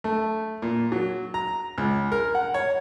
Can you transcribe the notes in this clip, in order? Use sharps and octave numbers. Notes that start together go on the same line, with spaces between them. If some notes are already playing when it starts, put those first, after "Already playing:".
A3
A#2
F#3
A#5
C#2
A#4
F#5
C#5